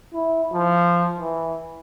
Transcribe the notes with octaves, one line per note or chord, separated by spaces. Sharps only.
E4
F3
E3